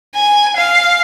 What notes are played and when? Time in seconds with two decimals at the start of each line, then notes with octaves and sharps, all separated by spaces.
0.15 G#5
0.57 F5